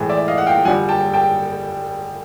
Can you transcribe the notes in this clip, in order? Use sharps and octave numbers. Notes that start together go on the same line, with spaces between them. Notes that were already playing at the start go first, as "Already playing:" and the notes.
Already playing: A2 E3 G#3
D5 E5
D#5 F5
F#5
F5 G5
F2 D3 G3 F#5 G#5
G5 A5
G5 A5